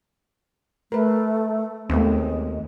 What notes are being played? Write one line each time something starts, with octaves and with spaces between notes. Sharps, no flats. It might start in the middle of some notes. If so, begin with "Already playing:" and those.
A3 A#4 B4
D#2 G#3 A3 B3 C4